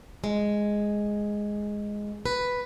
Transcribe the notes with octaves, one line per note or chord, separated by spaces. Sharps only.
G#3
B4